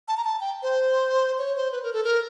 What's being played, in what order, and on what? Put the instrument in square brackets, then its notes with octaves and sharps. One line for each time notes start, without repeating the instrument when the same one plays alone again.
[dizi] A5
A#5
A5
G5
C5
C#5
C5
B4
A#4
A4
A#4